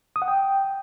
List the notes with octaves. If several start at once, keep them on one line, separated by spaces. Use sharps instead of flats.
D#6
F#5
G5